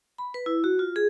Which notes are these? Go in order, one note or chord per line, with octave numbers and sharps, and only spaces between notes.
B5
B4
E4
F#4
F4
G#4